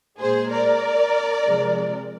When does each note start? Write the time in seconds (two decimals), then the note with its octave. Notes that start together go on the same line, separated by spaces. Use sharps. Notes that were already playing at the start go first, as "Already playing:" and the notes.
0.20 A#2 G#3 G#4 C5
0.51 A#4 D5
1.48 C3 F3 G#3